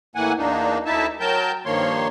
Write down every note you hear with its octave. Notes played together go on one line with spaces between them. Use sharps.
A2 E3 A#3 F#5 G#5
E2 A#3 D4 D#4
D2 D#4 E4 E5 A5
F#3 A#4 G5 A5 G6
G2 D#3 F3 A#3 C#5 C6